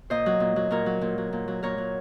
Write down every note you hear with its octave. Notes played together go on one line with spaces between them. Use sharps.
A#2 C5 D#5
F#3
A#2
F#3
A#2 A#4 C#5
F#3
A#2
F#3
A#2
F#3
A#2 A#4 C#5
F#3